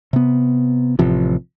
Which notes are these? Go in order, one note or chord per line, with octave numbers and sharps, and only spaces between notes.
C3 B3
A1 C3 F3